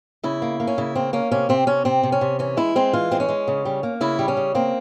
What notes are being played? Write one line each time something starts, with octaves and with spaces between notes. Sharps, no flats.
C#3 E4
A#3
A#3
C#4
C#3 E4
A#3 C4
A#3 C#4
C3 C#4
C3 C4
C3 C#4
C3 C4
C3
C#4
C3
E3 C#4
G#3 E4
G#3 C4
E3 F4
G#3 C4
C#4
G#3
C#3
G3
A#3
C#3 E4
G3
C#4
C#3
A#3 C4